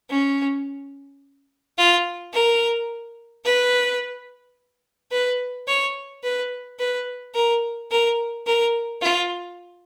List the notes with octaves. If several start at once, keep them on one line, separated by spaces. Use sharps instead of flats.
C#4
F4
A#4
B4
B4
C#5
B4
B4
A#4
A#4
A#4
F4